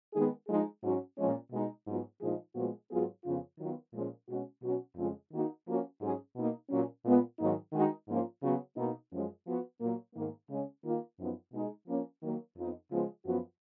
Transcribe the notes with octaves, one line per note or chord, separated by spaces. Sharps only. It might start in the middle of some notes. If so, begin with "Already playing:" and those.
D#3 G#3 B3 D#4 G#4
F3 G#3 D#4 G#4
G#2 F#3 C#4 F#4
A#2 F3 G#3 C#4
B2 G#3 D#4
G#2 F#3 B3 F4
A#2 F3 G#3 D#4 G#4
A#2 F3 G#3 B3 F#4
G#2 F#3 B3 F4 G#4
F2 C#3 F3 B3 F4
D#3 F#3 B3 F4
A#2 F3 G#3 C#4
B2 G#3 C#4 F#4
B2 F#3 C#4 F#4
F2 C#3 G#3 C#4 F4
D#3 A#3 D#4 F#4
F3 A#3 C#4 F#4
G#2 F#3 C#4 G#4
B2 A#3 D#4
A#2 F#3 C#4
A#2 G#3 B3 F4
G#2 D#3 F#3 A#3 D#4
D#3 G#3 D#4 F#4
G#2 F3 A#3 C#4 F4
C#3 F#3 B3 F#4
B2 A#3 D#4
F#2 F3 G#3 C#4
F3 B3 F#4
A#2 F#3 A#3
G#2 D#3 A#3
C#3 G#3 C#4
D#3 A#3 F4
F#2 F3 B3 D#4
B2 G#3 D#4 G#4
F3 A#3 C#4
D#3 F#3 A#3
F2 F3 B3 D#4
C#3 F3 G#3 B3 F4
F#2 F3 B3 F#4